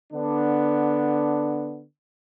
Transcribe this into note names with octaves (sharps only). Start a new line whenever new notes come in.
D3 B3 D4